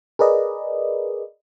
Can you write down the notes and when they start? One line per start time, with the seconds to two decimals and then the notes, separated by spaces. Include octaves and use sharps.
0.19 G#4 A#4 B4 D5 D#5